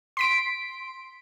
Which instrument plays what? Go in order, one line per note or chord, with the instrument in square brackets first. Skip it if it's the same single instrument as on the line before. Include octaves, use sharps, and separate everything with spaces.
[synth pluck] C6 B6 D7